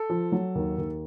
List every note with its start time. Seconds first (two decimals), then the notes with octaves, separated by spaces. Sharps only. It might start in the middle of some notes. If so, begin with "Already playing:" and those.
Already playing: A4
0.10 F3
0.32 F#3
0.55 D#2
0.78 D#2